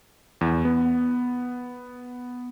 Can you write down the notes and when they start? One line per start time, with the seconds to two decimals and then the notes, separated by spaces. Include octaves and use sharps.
0.41 E2
0.65 B3